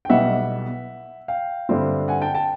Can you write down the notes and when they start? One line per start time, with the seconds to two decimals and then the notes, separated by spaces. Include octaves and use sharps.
0.05 G5
0.09 B1 B2 G3 B3 E4 E5 F#5
1.28 F5 G5
1.69 G2 D3 G3 C4 E4
2.08 F#5 G#5
2.21 G5 A5
2.34 G5 A5